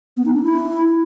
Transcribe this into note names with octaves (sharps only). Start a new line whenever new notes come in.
B3
D#4
D4
E4